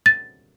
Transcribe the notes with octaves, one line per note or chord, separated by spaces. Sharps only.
A6